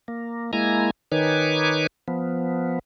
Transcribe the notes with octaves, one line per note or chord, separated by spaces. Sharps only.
A#3
G#3 A#3 E4 G#5 A#5
D#3 D#4 B4 C#5 G#5 D6
F3 B3